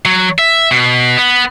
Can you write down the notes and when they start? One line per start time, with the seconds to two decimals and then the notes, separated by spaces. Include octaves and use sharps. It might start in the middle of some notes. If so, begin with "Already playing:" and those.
0.05 F#3
0.39 E5
0.71 B2
1.17 B3